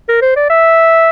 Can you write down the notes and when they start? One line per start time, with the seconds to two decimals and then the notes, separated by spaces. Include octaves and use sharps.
0.09 A#4
0.22 C5
0.36 D5
0.50 E5